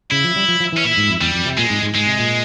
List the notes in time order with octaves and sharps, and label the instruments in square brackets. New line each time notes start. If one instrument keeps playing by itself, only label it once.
[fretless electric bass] C#3 [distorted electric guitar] E4
[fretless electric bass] F3
G3
F3
F3
[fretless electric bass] E3 [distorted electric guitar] C#4
[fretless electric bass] A#2 [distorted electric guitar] E4
[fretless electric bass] G#2
F2
[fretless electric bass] E2 [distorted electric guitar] G3
[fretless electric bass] F2
C3
[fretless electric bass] A#2 [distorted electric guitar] G#3
[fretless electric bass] G#2
G#2
[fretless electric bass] G#2 [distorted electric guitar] G#3
[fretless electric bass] C3
A#2